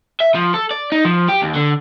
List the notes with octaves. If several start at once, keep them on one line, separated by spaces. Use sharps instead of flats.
E5
F3
A4
D5
D#4
F3
G4
D#2
D3